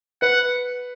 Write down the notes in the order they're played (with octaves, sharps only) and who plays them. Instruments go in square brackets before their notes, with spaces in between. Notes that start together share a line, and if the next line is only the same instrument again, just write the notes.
[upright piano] B4 [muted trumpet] F#5